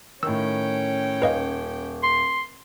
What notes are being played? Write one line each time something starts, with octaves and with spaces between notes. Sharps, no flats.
A2 D#3 C#4 G5 E6
D#1 B4 D#5 F5
C6